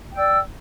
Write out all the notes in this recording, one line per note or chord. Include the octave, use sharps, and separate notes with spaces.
D5 G5 E6